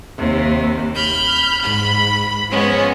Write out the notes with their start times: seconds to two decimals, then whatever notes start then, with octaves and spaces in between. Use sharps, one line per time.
0.17 D#2 C3
0.94 B5 F6 G6
1.63 G#2 B5
2.49 F3 G#3 B3 C#4